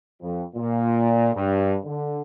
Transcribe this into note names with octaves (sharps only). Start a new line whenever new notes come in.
F2
A#2
G2
D3